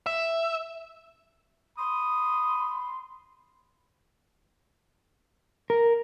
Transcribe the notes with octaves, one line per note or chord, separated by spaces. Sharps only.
E5
B5 C6 D#6
A#4